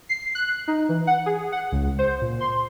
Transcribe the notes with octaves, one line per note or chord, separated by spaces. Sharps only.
C7
F#6
D#4
E3
F#5
G#4
F#5
C#2
C5
A#2
C6